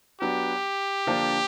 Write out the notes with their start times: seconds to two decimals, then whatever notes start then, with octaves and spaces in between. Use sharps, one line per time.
0.21 F#3 B3 D4 G4
1.06 D3 F3 A#3 D4